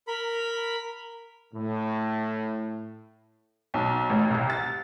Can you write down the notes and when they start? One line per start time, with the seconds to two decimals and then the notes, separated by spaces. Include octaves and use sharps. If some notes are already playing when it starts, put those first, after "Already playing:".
0.07 A#4 B5
1.54 A2
3.74 B1
4.10 A1
4.30 C2
4.50 A6